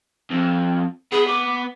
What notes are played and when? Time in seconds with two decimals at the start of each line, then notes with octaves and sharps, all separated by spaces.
0.31 F2
1.12 B3 G#4
1.28 D6